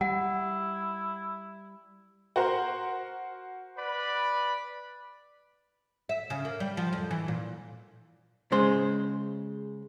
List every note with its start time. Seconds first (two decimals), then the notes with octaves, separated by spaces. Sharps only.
0.01 G3 E4 F#5
2.36 F#4 A#4 C5
3.78 B4 D5 B5
6.09 E5
6.30 C#3
6.45 A#3
6.60 G3
6.77 F3
6.93 F2
7.11 E3
7.28 A#2
8.52 C#3 G#3 C5